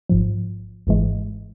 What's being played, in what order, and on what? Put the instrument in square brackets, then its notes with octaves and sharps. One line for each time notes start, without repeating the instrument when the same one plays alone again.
[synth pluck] A1 G#2 F3
G#1 G#2 E3 G#3